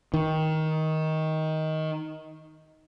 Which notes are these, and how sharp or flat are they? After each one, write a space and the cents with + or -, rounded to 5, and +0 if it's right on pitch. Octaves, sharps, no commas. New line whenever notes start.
D#3 +15